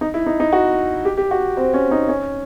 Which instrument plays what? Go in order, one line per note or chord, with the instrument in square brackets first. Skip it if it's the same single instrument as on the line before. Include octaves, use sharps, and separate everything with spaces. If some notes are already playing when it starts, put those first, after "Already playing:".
[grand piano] D#4
E4
D#4
D#4
F#4
G4
G4
F#4
C4
C#4
D#4
C#4